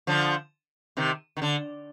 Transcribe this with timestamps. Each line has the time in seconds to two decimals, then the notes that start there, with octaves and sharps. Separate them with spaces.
0.07 D3 F3
0.97 C3 D#3
1.37 D#3
1.42 D3